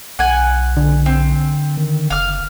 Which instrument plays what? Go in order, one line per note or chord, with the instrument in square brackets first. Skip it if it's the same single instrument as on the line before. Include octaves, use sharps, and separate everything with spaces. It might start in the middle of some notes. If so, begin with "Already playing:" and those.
[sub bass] B1 [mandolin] F#5 G#5
[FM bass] D3
[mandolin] C4
[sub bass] D#3
[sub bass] F#1 [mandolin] F5 F6